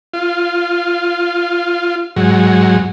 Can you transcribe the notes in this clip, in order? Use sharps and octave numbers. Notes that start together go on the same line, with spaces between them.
F4
G#2 F#3